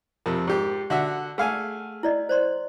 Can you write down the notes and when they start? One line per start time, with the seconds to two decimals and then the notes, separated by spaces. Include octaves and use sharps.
0.26 F2 C3 A#4
0.47 G#2 G4
0.90 D3 F#4 E5
1.38 A3 G#4 F5 F#5 G#5
2.03 E4 D5 D#5
2.29 C5 D5 C6